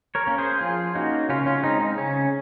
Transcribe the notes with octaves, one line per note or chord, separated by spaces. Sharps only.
A#4 C#5
A#3 C#4
G#4 C5
F3 F4 G#4
A#3 C#4 D#4 F#4
C#3 C#4 F4
C#4 F4
G#3 C4 D#4
D#4
C#3 C#4